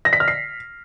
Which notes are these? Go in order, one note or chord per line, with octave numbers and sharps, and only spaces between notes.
A#6
B6
F6
C7